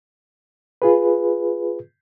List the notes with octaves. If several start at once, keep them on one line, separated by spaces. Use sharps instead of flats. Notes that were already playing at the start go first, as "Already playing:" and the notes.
F4 G#4 B4